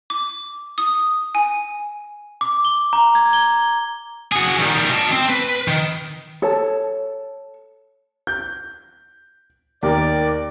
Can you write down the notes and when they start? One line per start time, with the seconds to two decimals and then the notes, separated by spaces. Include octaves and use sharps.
0.10 D6
0.78 D#6
1.35 G#5
2.41 D6
2.65 G7
2.93 A#5
3.15 G#6
3.33 G7
4.32 F#4 G#4
4.60 D#3 G3
4.90 D#5 A5
5.13 C4
5.30 B4
5.68 D#3
6.42 A4 C#5 A5
8.27 G6
9.83 D#2 G4 A#4 D5